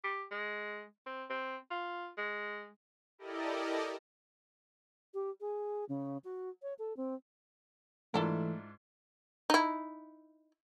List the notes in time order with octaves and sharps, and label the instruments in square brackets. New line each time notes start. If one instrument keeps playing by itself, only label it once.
[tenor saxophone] G4
G#3
C4
C4
F4
G#3
[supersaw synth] E4 G4 A4 A#4 D5 D#5
[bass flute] G4
G#4
C#3
F#4
C#5
A4
C4
[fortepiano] G#2 D4 F4 [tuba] E3 [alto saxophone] A3 [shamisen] E4 A4 A#4
[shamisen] D#4 E4